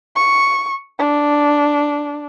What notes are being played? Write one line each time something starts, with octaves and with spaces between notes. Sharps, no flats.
C#6
D4